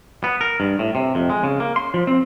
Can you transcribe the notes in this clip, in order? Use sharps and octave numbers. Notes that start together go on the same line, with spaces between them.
B3
A#4
G2
A2
C3
F2
G#3
C#3
A#3
C6
F3
C4